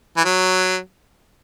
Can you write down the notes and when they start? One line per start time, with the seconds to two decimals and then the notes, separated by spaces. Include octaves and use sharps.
0.17 E3
0.25 F#3